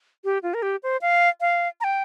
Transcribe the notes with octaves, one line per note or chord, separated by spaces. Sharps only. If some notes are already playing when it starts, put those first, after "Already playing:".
G4
F4
A#4
G4
C5
F5
F5
A#5
G5